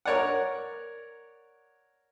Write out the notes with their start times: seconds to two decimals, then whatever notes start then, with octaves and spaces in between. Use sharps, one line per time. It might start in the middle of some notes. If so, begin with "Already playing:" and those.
0.05 A#4 C#5 D5 F#5